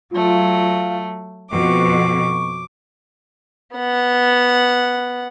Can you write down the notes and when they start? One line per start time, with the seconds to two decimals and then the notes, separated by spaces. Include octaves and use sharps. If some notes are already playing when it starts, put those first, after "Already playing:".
0.11 F#3 A3 F4
1.51 F2 B2 C#6 D6
3.75 B3 F#5